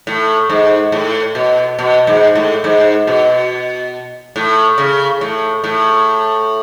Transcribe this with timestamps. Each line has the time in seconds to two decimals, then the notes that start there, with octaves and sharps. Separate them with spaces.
0.07 A2
0.49 G#2
0.92 A2
1.35 B2
1.79 B2
2.07 G#2
2.35 A2
2.64 G#2
3.07 B2
4.36 A2
4.78 C#3
5.21 A2
5.64 A2